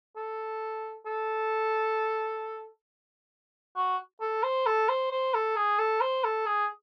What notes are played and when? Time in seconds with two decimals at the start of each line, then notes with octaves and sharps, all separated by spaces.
0.16 A4
1.06 A4
3.76 F#4
4.21 A4
4.43 C5
4.66 A4
4.89 C5
5.11 C5
5.34 A4
5.56 G#4
5.79 A4
6.01 C5
6.24 A4
6.46 G#4